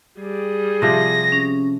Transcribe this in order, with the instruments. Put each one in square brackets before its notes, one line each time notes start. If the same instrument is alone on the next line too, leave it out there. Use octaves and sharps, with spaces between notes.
[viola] G3 G#4
[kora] C3 F3 [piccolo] A#6
[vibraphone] C#4